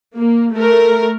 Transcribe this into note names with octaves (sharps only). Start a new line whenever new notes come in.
A#3
A3 A#4